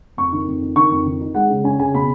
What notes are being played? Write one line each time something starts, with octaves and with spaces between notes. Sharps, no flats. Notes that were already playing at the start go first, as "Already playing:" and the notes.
F2 C#6
D#3
F2
D#3
D#3 C#6
F2
D#3
D#4
G#3 F#5
C#3
C#4 G#5
C#3 G#5
B2 B5